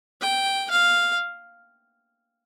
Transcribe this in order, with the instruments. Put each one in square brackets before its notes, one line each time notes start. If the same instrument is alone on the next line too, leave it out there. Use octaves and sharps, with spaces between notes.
[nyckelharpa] G5
F5